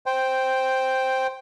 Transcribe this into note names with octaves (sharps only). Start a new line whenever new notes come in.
C5 G5